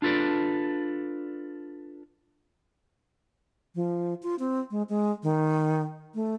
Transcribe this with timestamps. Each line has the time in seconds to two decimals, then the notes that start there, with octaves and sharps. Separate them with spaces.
0.02 D4 F4 A4 B4 D5
3.75 F3
4.23 F4
4.39 C4
4.71 G#3
4.89 G#3
5.23 D#3
6.15 A3